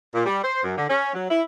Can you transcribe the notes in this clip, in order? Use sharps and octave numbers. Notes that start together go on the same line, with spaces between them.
A#2
G3
C5
F#2
D3
C#4
F#3
E4